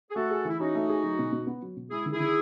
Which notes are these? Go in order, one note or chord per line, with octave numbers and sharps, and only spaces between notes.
G#4
A3 F#4 A4
G#4
E3 E4
C#4 D#4 F#4
A3
G#4
F#3
B2
B2
B3
F#3
B2
G#3 E4 G#4
D#3
E4 G#4
D#3